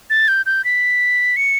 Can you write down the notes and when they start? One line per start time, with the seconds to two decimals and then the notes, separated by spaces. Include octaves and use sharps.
0.10 A6
0.28 G6
0.46 G6
0.65 B6
1.37 C#7